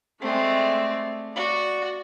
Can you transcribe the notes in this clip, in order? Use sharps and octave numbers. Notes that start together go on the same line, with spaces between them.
G#3 A3 C4 D5
F#4 D5